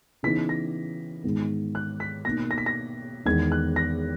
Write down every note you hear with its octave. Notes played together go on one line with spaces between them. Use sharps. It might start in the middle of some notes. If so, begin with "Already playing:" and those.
C#3 E3 B3 D#4 B6
A#6
G#2 D#3 G#3 B3
F#6
B6
B2 A#3 D#4 A#6
A#6
B6
A#6
E2 D#3 G#3 B3 G#6
F#6
A#6